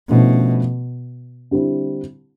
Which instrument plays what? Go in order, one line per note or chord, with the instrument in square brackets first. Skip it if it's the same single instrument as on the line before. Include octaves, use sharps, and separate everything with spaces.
[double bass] B2 [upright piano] D3 F3 A3 C#4 E4
[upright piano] D3 G3 C4 E4